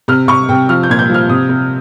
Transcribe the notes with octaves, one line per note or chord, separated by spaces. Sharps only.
C3 F6
C3 C#6
C3 G5
F3 F6
G6
A#2 G#6
G6
F3 F6
C3 D#6
C3